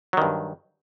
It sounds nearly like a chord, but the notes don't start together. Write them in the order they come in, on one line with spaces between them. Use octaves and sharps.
F#3 D#3 G2